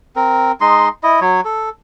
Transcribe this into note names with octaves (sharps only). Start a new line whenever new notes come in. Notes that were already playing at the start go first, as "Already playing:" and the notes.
C4 A#4
G#3 D#4 D#5 C6
E4 D#5
F#3 C#5
A4